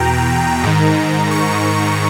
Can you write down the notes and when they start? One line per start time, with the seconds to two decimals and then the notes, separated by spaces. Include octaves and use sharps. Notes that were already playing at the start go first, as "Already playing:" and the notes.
Already playing: E2 B2 G5 A#5
0.64 G#2 D#3
1.31 C#6